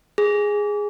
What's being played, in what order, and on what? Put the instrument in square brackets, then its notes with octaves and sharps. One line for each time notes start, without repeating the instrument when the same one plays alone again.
[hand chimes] G#4